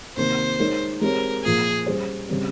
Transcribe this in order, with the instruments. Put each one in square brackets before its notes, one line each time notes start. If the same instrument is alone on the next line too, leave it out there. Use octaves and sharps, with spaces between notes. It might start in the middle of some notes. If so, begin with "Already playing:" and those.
[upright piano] C3 D#3 A#3 [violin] C5
[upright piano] G#3 D#4 A#4 C#5
[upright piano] G#3 C4 G4 C#5 [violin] A#4
[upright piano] A#2 F3 A#3 F4 [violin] G#4
[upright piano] G3 C#4 G#4 C5
C#3 G3 C4